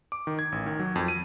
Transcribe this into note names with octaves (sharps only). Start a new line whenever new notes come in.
D6
D#3
G#6
A1
D#3
F#3
F2
D#7